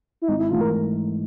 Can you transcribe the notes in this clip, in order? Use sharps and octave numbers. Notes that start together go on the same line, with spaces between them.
E4
G#1 D#4
E4
G#2 E3 A3 F4
A#4